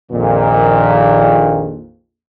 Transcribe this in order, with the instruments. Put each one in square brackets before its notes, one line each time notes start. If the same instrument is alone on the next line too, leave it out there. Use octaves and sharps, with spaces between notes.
[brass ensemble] A#1 F2 A#2 D#3